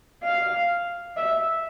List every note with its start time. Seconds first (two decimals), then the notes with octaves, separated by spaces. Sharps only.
0.23 F5
1.17 E5